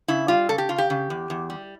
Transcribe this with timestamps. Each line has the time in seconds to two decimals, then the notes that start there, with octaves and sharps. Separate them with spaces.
0.08 C#3 E4
0.28 G3 F4
0.49 C#3 A4
0.58 G4
0.69 C#3 F4
0.78 G4
0.90 C#3
1.10 E2
1.30 E2
1.50 G3